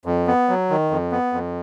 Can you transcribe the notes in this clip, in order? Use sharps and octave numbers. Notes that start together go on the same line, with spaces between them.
F2
B3
F#3
D#3
F2
B3
F2